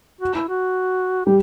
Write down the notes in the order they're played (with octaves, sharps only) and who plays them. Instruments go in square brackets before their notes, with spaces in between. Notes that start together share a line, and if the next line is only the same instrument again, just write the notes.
[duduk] F#4
E4
F#4
[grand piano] G3 [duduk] G4